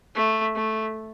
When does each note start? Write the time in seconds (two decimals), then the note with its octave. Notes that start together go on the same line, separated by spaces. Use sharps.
0.15 A3
0.55 A3